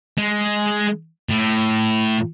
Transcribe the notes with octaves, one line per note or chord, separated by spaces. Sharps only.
G#3
A2